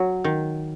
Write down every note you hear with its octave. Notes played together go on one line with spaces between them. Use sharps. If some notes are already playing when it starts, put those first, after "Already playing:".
Already playing: F#3
D#3